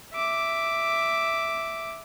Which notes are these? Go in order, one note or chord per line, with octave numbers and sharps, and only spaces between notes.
E5 D6